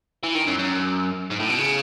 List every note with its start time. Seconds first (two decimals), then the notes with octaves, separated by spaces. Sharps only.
0.24 E3
0.35 D#3
0.47 F#2
0.59 F#2
1.31 G#2
1.40 A2
1.49 B2
1.58 C#3